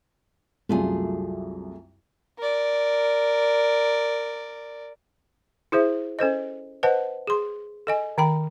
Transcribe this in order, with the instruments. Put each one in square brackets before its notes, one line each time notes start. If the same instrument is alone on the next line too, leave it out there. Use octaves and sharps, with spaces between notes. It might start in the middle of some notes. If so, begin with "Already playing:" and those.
[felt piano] C2 F#2 [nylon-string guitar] A3 F4 G#4
[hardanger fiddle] A#4 D5
[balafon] E4 G#4 C5 E5
C#4 A4 C5 D#5
B4 C5 D#5 F#5 A5
G#4 C6
A4 D#5 G#5
D#3 G5 B5